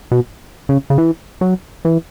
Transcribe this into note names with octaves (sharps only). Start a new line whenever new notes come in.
B2
C#3
C#3
E3
F#3
E3